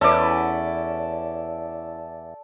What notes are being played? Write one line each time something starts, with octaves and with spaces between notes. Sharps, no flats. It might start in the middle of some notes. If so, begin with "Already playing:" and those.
E2 C#4 E4 A4 B4 D5